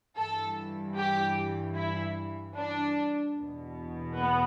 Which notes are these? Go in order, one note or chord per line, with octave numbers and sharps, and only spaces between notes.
G2 E3 A4
G4
E4
D4
E2 B2
B3